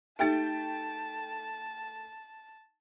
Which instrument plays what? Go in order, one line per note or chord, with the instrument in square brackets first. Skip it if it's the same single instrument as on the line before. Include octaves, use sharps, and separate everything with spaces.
[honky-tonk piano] A3 G5 A6 [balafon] D#4 G4 E5 [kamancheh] A5